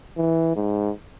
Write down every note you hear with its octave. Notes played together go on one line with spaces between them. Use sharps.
E3
G#2